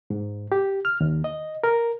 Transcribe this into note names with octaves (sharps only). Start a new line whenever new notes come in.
G#2
G4
F6
D#2
D#5
A#4